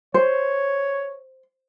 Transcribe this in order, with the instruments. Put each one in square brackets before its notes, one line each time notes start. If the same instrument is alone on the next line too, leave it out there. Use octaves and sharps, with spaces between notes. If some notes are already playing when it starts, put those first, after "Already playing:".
[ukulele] C5 [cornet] C#5